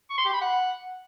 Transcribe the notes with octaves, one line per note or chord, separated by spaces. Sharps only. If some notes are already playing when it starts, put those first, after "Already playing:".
C#6
C6
G4
B5
F#5